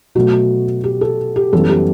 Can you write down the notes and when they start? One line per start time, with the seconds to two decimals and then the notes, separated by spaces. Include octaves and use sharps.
0.15 B2 F#3 A3 F#4
0.84 G4
1.01 A4
1.36 G4
1.53 F#2 E3 G3 B3 A4
1.69 G4